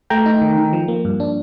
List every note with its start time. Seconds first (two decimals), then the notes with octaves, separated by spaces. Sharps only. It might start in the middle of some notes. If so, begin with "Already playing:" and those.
0.10 A3 G5 A#5
0.26 D#4
0.42 D#3
0.58 D#3
0.73 F3
0.88 A#3
1.05 G2
1.20 D4